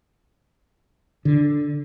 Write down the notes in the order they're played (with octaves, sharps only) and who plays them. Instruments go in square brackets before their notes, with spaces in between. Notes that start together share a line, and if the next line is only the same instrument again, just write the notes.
[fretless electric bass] D3